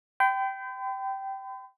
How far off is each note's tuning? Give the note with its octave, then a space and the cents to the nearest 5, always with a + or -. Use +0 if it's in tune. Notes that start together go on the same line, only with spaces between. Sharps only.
G5 -15 B5 +45